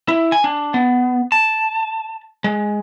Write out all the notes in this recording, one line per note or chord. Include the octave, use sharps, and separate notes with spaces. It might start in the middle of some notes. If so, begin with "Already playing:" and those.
E4
G#5
D4
B3
A5
G#3